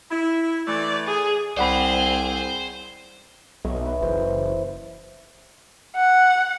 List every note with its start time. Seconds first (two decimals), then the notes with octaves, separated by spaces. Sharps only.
0.11 E4
0.67 E3 A3 D5
1.07 G#4
1.57 C2 C4 G#4 C5 D5 F#5 B5
3.64 B1 D#5 E5 C#6
3.86 B4
4.01 F#1 E3 C5 C6
5.96 F#5